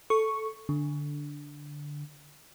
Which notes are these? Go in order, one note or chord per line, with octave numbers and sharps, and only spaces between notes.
A4 C#6
D3